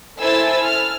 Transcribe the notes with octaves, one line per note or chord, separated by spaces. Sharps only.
E4 A4 C5 G#5 E6 A6
F6